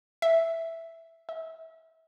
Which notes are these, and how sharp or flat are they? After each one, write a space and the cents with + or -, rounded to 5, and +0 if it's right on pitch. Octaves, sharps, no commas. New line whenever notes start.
E5 +0
E5 -30